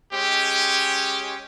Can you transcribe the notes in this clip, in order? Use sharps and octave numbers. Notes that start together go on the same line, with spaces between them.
G#3 C#4 G4